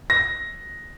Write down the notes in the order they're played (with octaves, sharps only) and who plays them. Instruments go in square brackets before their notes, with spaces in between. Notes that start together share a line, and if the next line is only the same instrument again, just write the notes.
[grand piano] A#6